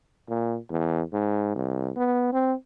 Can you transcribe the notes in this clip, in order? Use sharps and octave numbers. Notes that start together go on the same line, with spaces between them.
A#2
E2
G#2
C2
B3
C4